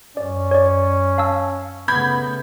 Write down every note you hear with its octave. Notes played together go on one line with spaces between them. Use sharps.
F#2 C#4 D5
C#5 D5
F5 A5 E6
C#3 A3 B3 B5 G6 G#6